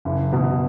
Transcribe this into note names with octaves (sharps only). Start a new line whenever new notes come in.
F#1
B2